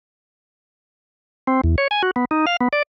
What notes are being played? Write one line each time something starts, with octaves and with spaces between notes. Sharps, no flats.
C4
E2
C#5
G#5
F#4
B3
D#4
F5
B3
D5